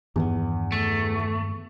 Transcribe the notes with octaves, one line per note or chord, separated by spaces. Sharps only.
E2 G2 D#3 B3
A3